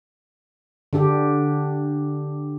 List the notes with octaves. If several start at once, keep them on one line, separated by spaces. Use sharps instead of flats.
D3 D4 G4